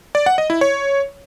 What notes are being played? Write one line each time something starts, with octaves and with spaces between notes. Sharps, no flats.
D5
F#5
D#5
E4
C#5